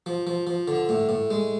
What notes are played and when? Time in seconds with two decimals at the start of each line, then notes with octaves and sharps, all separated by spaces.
0.06 F3
0.27 F3
0.47 F3
0.68 D3
0.89 A2
1.09 A2
1.30 G#3